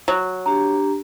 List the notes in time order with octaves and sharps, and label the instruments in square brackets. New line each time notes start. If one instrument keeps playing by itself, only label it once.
[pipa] F#3
[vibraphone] D4 G4 [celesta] A#5